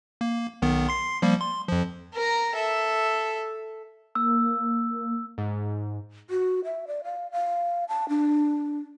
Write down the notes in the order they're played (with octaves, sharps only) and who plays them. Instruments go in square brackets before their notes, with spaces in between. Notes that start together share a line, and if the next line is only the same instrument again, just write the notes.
[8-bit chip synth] A#3
B1 D#3 B3
C6 C7
F3 G3 A#3
C6
F2 F3
[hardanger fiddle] A#4 A#5
A4 E5
[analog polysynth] A#3 [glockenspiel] E6
[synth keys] G#2
[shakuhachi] F#4
E5
D5
F5
F5
A5
D4